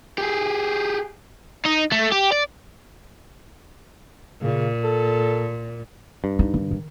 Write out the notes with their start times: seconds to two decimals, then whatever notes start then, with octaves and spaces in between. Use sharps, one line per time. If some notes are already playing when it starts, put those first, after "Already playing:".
0.18 G4 G#4
1.65 D#4
1.92 A3
2.12 G4
2.32 D5
4.42 A#2 C#3
4.84 A4
6.24 G2
6.39 D#4
6.54 D#3
6.71 D#3